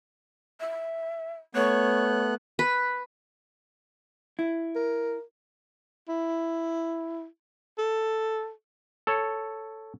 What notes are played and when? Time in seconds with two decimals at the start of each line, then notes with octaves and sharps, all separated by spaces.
0.60 E5
1.55 A3 B3 C#5 F#6
2.59 B4
4.39 E4
4.75 A#4
6.09 E4
7.78 A4
9.07 A4 C#5